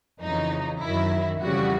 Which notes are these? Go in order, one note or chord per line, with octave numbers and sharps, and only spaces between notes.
F2 C#3 E3 D#4
F#2 D#3 F#3 E4
F2 C#3 E3 G3 F#4